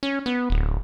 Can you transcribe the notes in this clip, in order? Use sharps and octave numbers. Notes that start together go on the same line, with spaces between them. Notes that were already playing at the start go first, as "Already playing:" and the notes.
C#4
B3
D1